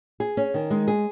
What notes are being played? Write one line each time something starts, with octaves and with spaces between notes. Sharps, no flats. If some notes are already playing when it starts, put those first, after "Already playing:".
G#4
C#4
D#3
G#3
G#4